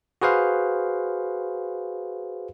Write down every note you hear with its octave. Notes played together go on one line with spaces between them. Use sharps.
F#4 G#4 B4 C5 F5